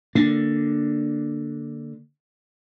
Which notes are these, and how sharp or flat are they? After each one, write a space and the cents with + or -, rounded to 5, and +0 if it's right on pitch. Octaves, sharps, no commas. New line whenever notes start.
D3 +0 A#3 +0 D4 +0